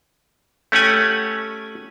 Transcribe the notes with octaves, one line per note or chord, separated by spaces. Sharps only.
A3 C#4 G4 F#5 G#5